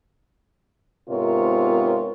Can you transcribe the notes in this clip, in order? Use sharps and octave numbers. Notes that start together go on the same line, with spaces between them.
G#2 C3 B3 F4 A#4 C#5